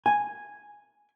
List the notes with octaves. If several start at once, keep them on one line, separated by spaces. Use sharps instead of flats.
G#5